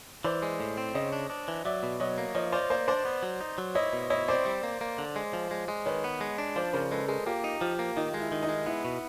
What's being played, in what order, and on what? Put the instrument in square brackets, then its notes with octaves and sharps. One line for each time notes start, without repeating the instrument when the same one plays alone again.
[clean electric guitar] E3 [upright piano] C5 D5
[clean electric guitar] G#3
A2
C4
[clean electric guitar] C#3 [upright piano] C#5 D#5
[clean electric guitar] D4
D4
E3
[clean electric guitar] F#3 [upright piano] D5 E5
[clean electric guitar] B2
[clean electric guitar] F#3 [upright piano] C#5 D#5
[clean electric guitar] A#3
[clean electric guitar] F3 [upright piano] C#5 D#5
[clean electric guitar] F4 [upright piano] C5 D5
[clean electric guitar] A#3 [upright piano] C5 D5
[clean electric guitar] D4 [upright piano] C5 D5
[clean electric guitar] B3
F#3
D#4
F#3
[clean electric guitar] E4 [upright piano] C#5 D#5
[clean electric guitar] B2
[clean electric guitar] E4 [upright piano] C#5 D#5
[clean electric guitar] C4 [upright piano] C5 D5
[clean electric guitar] G3
A#3
A#3
D3
G#3
F3
G#3
G#3
[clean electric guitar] D#3 [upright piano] B4 C#5
[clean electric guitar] B3
G#3
D4
[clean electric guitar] F3 [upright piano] C5 D5
[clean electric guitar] C#3 [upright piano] A#4 C5
[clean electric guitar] G#3 [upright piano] A4 B4
[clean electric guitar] G#3 [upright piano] G#4 A#4
[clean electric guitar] A#3 [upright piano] F4 G4
[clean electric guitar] D#4
[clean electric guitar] F3 [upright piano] F4 G4
[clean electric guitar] A#3
[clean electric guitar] D#3 [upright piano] D#4 F4
[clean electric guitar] G#3
[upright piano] E4
[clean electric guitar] D#3
[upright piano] D#4
[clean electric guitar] G#3
[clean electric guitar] B3 [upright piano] E4
[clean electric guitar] B2